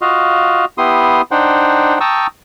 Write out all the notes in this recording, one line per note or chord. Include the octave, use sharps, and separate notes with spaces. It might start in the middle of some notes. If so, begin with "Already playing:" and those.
F4 F#4 D#5 F5
B3 E4 G4 C6 D#6
D4 D#4 C5 F#5 G5
G5 A5 A#5 C#6 D#6 E6